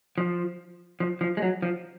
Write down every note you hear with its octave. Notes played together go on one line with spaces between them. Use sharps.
F3
F3
F3
G#3
F#3
F3